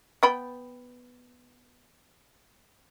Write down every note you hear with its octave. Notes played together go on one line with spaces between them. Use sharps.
B3 G5 B5